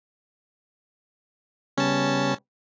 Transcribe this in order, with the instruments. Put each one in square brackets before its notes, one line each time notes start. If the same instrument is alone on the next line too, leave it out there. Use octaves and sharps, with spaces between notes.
[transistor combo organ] C#3 G3 B3 [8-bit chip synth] C#4 A5